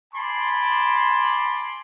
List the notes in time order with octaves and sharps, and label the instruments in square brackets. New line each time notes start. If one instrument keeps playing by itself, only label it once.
[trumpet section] G#5 A5 B5 C6 D6